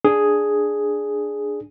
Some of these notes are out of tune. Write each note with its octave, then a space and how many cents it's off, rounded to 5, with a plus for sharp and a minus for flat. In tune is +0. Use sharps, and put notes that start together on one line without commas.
D4 +0 G#4 +0